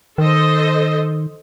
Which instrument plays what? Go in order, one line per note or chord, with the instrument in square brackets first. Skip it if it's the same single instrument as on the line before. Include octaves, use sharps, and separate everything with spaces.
[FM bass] D#3 [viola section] A4 C5 D#5